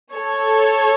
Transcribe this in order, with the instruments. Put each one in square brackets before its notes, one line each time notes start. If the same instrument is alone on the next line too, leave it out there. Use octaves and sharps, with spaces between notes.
[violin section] A4 C#5